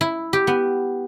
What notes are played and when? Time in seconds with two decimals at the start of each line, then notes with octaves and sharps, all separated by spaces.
0.01 E4
0.33 G4
0.47 B3